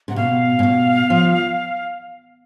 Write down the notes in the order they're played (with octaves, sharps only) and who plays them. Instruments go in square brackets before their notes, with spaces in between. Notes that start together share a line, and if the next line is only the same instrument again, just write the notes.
[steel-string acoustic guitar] C3 [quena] F#5
[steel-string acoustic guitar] B2 [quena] F5
[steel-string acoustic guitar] A#2
B2
F3